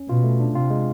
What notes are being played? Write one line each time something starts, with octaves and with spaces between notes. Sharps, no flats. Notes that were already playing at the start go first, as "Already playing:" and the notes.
Already playing: C#4
B2 F4
A3
D4
C3 F4
G#3